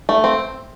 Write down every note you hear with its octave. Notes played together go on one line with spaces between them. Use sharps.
A3
C4